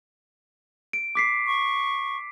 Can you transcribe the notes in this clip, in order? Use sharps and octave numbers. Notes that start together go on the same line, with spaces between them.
D7
D6 B6 C7
C#6